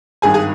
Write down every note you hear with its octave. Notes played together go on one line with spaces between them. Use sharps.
G#1 G2 D#3 G#4 G#5
G#4 G#5